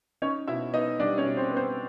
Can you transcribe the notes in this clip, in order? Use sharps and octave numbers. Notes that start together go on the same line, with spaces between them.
C#4 D#4 C#5
B2 E4 E5
B3 D#4 D#5
G3 D4 D5
C#4 C#5
B2
C4 C5
B3
C4 C5